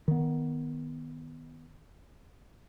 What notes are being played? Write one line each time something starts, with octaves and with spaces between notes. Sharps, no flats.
D#3 B3